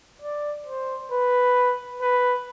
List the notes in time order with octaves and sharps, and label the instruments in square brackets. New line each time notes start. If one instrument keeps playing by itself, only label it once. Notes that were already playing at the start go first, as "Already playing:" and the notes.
[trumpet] D5
C5
B4
B4